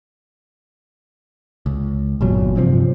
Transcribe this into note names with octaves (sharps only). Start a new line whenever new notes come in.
C#2
G1 E2 A#2 F#3
G2 C3 F3